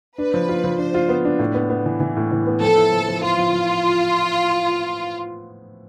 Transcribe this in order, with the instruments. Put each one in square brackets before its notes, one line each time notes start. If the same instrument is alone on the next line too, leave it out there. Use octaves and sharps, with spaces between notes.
[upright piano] D4 [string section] B4
[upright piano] F3
F4
F3
[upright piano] D4 [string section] C5
[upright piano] F4
B3
D4
A2
B3
B3
E3
E3
A2
E3
B3
[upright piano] F3 [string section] A4
[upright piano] E4
F3
F3
[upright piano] E4 [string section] F4
[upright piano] F3
F3